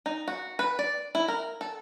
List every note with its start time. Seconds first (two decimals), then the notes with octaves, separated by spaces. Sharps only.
0.06 D#4
0.28 F#4
0.59 B4
0.79 D5
1.15 E4
1.28 A#4
1.61 A4